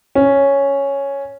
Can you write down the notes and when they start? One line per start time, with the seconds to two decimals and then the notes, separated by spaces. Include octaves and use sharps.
0.15 C#4